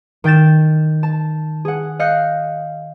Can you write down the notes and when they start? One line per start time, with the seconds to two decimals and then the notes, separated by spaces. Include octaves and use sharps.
0.24 D#3 G5 G6 A6 E7
1.03 A5
1.65 G#4 F#5
1.99 D#5 F5 F#6 G6 C#7